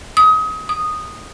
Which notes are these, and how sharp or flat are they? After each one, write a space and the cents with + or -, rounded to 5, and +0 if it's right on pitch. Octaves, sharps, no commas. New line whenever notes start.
D#6 +30
D#6 -10